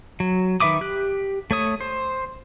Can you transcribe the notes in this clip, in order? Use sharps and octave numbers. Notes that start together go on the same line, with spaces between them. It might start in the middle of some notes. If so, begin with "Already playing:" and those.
F#3
D#3 B4 E5 D6 D#6
G4 F#6
A3 C#5 D#6
C5